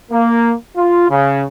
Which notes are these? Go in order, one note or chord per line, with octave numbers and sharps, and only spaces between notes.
A#3
F4
C#3